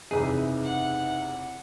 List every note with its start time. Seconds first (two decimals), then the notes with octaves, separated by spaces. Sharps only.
0.11 F#1 E2 C3 D#4 G#4 B4 E5
0.62 F#5